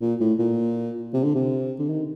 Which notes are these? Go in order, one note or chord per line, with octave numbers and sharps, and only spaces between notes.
A#2
A2
A#2
C3
D3
C3
D3
D#3